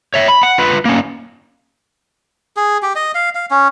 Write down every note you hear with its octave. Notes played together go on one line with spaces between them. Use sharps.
C#5 E5
B5
F#5
F4 B4
A#3 C#4
G#4
G4
D#5
F5
F5
C#4